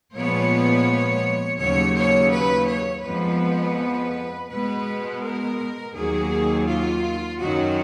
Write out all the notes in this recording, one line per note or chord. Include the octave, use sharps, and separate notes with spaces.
A#2 F3 G#3 B3 C#5
D#2 C#3 F#3 A#3 C#5
C#5
B4
C#5
F2 F3 G#3 B3 B4
B2 G#3 B3 B4
A#4
D#2 D#3 F#3 A#3 G#4
F4
F#2 D#3 F#3 F#4